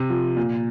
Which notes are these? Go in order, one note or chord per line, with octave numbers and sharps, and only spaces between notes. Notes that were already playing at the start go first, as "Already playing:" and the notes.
Already playing: C3
F3
A#2